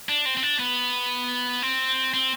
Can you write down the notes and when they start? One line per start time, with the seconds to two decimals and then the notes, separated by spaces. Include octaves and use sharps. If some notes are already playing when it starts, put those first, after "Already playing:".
0.09 D4
0.25 C4
0.37 C4
0.43 D4
0.59 B3
1.62 C4
2.14 C4